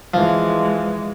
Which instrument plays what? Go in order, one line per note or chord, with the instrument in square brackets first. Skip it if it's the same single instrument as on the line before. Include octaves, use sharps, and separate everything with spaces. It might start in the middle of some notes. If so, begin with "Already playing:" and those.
[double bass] E3 G#3 [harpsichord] F3